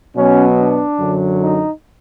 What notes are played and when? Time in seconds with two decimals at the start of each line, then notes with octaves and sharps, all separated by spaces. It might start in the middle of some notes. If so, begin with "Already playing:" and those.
0.16 B2 F#3 B3 C#4
0.58 D4
0.99 F#2 D3 F#3
1.41 D#4